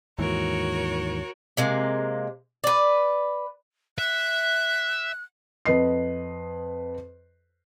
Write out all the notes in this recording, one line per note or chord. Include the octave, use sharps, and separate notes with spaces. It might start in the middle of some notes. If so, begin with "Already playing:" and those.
D#2 G#2 E3 F#4 A#4 C#5
C3 G#3 A#3
B4 D5
E5 F#6
F2 B4 D#5 C7